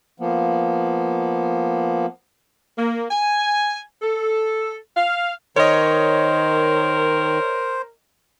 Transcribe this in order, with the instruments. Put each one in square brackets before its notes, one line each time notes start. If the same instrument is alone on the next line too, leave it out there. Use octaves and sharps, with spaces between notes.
[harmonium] F3 A#3 B3
[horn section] A#3
G#5
A4
F5
[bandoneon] D#3 [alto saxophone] A#4 [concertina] C5 [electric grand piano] C#5 D#5